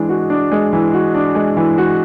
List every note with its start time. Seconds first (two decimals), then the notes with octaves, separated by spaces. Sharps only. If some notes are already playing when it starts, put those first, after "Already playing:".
Already playing: E3 G#3 D4
0.09 F#4
0.30 D4
0.52 G#3
0.73 E3
0.94 F#4
1.14 D4
1.35 G#3
1.57 E3
1.78 F#4